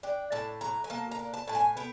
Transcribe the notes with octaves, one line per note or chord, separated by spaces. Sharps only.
D4 G5
A2 A5
F#3 A#5
G#5
A#3 A5
A#5
D4
A5
A2 A5
G#5
B3 G5